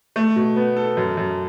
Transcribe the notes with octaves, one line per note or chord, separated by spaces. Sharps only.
A3
B2
B3
A4
F#2
F#2